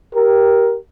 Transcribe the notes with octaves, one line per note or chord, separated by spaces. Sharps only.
G4 A#4